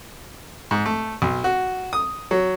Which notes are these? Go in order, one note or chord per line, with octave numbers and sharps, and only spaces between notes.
G#2
A3
B1
F#4
D#6
F#3